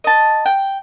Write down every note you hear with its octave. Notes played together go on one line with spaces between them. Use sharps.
D#5 A5
G5